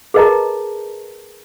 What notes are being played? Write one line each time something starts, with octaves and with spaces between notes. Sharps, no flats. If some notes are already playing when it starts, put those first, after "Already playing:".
G#4 A#4 B4 D#5 A5 A#5